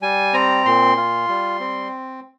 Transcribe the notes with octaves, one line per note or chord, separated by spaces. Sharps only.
G3 G#5
C4 A#5
A#2 C6
F4
G3
C4